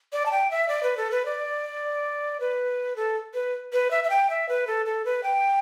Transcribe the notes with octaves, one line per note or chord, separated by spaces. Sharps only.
D5
A5
G5
E5
D5
B4
A4
B4
D5
B4
A4
B4
B4
E5
E5
G5
E5
B4
A4
A4
B4
G5